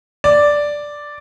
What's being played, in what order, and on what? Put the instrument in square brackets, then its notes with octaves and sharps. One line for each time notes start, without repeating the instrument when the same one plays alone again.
[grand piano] D5